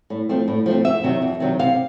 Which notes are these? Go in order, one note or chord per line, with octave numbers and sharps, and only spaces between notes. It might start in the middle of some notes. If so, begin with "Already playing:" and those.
A2
F3 A3 C4
A2
F3 A3 C4
F2 E5
C3 D#3 F#3
F2
C3 D#3 F#3
C3 F5